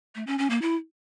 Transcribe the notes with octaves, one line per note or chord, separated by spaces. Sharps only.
A3
C#4
C#4
A#3
E4